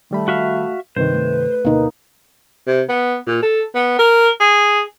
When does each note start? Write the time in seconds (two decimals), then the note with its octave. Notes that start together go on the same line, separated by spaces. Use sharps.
0.11 D#3 G3 A3 B5
0.28 F#4 E5 F5
0.96 G2 C3 D#3 B4 C5
1.14 A3
1.65 D2 B2 A#3 D#4
2.67 C3
2.89 B3
3.27 A#2
3.42 A4
3.75 B3
3.99 A#4
4.40 G#4